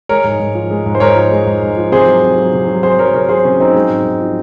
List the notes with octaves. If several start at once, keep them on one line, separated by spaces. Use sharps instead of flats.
G#3 A#4 C#5
G#2
G#2
F3
G#3
G#2
C5
G#2 A#4 C#5
F3
G#3
G#2
G#2
F3
C3 G#4 C5
F#3
C3
F#3
C3
F#3
C3 G#4 C5
F#3 A#4 C#5
C3 A#4 C#5
F#3 G#4 C5
C3 C#4
F#3 C4 D#4
G#3
G#2
G#2
F3